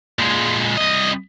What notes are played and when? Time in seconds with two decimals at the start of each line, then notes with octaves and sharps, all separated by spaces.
0.19 A#2 G#3
0.77 C2 D#5